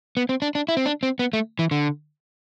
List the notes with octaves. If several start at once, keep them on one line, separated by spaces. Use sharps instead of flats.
B3
C4
D4
D4
E4
C4
D4
C4
B3
A3
E3
D3